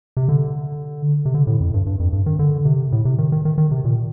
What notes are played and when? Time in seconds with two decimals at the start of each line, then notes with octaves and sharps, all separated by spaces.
0.17 C3
0.29 D3
1.25 C3
1.34 D3
1.47 A2
1.60 F2
1.74 G2
1.86 G2
2.00 F2
2.13 G2
2.26 D#3
2.39 D3
2.65 C3
2.92 A2
3.05 C3
3.18 D#3
3.32 D#3
3.45 D#3
3.58 D#3
3.71 C3
3.84 A#2